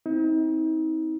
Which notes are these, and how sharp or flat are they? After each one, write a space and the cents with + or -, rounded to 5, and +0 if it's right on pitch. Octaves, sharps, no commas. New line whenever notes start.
C4 +0 D#4 +40